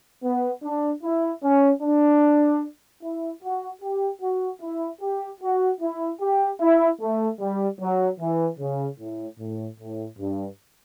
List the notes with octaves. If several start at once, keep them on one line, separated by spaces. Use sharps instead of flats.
B3
D4
E4
C#4
D4
E4
F#4
G4
F#4
E4
G4
F#4
E4
G4
E4
A3
G3
F#3
E3
C#3
A2
A2
A2
G2